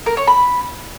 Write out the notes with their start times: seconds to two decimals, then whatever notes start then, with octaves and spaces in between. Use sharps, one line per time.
0.06 A#4
0.17 C#5
0.28 B5